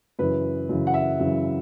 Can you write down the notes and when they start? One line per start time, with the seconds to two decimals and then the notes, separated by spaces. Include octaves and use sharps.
0.19 F#2 C#3 E3 B4
0.69 F#2 C#3 E3
0.87 F#5
0.94 E5
1.20 F#2 C#3 E3